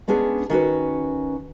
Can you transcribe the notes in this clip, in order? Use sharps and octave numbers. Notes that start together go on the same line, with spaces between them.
G#3 B3 C#4 D4 G#4
D#3 C#4 F#4 B4